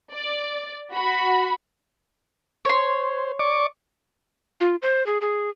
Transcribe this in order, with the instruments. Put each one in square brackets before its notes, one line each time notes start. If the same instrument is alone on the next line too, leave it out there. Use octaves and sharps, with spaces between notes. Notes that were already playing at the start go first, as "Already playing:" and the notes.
[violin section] D5
F#4 B5
[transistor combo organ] C5 [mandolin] C#5 C6
[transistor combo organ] D5 C#6 D6
[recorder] F4
C5
G#4
G#4